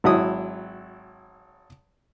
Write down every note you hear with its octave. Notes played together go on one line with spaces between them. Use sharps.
G#1 F#3 E4 D#6